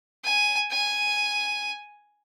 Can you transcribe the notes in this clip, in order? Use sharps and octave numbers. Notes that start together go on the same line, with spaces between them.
G#5
G#5